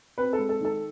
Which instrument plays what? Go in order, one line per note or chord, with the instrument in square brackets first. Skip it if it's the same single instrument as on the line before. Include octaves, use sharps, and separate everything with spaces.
[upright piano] C4 B4
A4
G#3
A4
D#3 A4